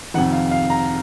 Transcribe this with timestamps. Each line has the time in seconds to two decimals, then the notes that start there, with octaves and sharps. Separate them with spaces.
0.14 F2 C3 D#3 F#5
0.33 F5
0.51 F5
0.70 A#5